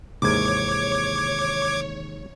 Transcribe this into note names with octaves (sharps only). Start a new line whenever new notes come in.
D#2 G#2 C3 D#3 E3 C#5 D6 G#6